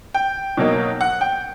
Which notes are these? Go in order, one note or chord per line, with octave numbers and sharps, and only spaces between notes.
G5
B2 F#3 A#3 D#4
F#5
G5